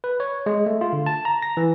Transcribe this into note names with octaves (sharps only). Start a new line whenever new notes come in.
B4
C#5
G#3
A3
F4
D3
A5
A#5
A#6
E3